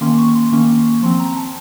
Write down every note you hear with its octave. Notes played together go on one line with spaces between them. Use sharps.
D#3 A#3 C#4 C6
C#6
C6
D#3 A#3 C#4 C#6
F3 C4 C6
A#5
A5